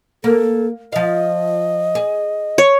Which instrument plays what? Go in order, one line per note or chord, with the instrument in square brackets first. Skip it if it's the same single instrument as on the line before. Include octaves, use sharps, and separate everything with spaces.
[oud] A#3 [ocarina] A4
[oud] F3 F5 [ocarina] D#5
[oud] G#4
[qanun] C#5